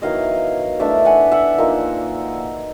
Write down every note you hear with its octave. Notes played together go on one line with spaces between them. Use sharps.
D#3 F#3 B3 E4 D#5 F5
E3 A3 D4 D5 E5
F#5 G#5
E5 F#5
A#2 F3 A#3 D#4